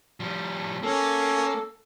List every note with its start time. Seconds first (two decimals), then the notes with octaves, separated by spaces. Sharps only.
0.20 F3 G3
0.83 A#3 C#4 A4